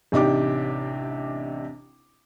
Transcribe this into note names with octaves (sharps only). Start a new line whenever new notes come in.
A1 C3 D4 D#4 G4 D6